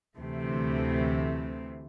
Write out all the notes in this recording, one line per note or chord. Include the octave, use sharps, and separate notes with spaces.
D2 C3 E3 A3